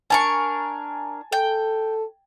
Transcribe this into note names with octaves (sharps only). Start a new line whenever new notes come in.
D4 A#4 G#5 A5 C#6
A4 G5